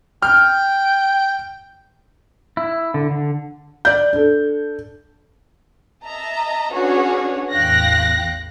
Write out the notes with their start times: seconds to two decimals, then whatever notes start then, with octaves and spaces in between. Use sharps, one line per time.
0.22 G5 F6
2.57 E4
2.94 D3
3.11 D3
3.85 D5 G6
4.13 D4 A4
6.05 D#5 E5 A5 A#5
6.72 C#4 D4 F#4 G#4 B4 C#5
7.52 A1 E2 F5 G5 F#6 A#6